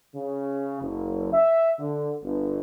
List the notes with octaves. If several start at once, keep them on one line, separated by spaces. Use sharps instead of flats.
C#3
F#1
E5
D3
G1